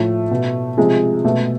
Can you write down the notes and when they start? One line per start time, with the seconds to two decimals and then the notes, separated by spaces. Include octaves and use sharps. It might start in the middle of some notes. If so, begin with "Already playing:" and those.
Already playing: A2 F3 A3
0.31 B2
0.77 C3 F3 G#3
1.24 B2 A3